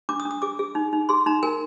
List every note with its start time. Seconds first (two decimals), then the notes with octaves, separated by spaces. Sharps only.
0.09 D4 D6
0.20 D#6
0.25 D4
0.31 D#6
0.42 G#4 D6
0.59 G#4
0.75 D#4
0.93 D#4
1.09 G#4 C6
1.26 D#4 A#5
1.43 A#4 G#5